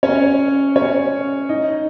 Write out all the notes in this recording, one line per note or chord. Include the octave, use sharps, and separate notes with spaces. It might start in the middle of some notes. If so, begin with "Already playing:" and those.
C#4 C#5
C#4 C#5
D#4 D#5